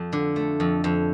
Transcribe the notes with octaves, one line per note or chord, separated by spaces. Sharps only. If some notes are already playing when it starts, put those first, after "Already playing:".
Already playing: F2
D3
A3
F2
F2